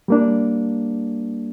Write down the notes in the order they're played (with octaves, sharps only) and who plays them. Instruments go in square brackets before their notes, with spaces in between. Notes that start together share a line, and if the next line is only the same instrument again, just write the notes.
[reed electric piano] G3 A#3 D4